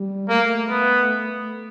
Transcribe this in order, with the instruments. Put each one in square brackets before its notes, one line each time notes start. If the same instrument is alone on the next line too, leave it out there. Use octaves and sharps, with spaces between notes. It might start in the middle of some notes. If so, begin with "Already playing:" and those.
Already playing: [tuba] G3
[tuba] A3 [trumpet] A#3
[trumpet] B3